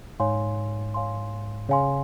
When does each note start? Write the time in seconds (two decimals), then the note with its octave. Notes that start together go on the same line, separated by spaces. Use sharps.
0.20 G#2 C#5 F5 G#5 C6
0.94 C#5 F5 G#5 C6
1.69 C#3 C#5 F5 G#5 C6